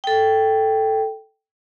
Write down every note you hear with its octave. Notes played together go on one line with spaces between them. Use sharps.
A4 G5